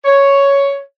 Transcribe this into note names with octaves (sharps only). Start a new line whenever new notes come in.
C#5